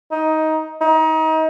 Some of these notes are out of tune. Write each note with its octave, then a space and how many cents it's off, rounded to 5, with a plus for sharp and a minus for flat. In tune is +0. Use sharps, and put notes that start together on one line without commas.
D#4 +15
D#4 +30